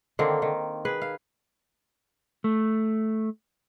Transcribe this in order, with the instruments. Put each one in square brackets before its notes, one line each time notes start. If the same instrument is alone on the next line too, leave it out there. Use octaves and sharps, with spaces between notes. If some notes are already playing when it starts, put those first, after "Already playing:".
[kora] D3 D#3 A#3 C4
D#3
G#4 B4
F5
[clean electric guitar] A3